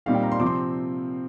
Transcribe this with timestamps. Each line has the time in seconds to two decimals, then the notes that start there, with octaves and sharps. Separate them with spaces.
0.06 A#2 G3 C4 D#4 F5
0.15 G5
0.23 A#5
0.32 C6
0.39 C3 F3 C4 D6
0.46 C6